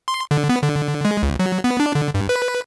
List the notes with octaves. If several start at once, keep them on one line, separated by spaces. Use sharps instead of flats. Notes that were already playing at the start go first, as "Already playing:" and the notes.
C6
D3
B3
D3
G#3
C#2
F#3
B3
D4
D3
G2
B4